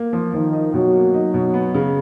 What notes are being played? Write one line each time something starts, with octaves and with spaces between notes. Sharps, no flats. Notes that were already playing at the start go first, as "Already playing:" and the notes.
Already playing: A#3
F3
D#3 F3
D#4
B2 F#3
A#3
D#4
B2
B3
C#3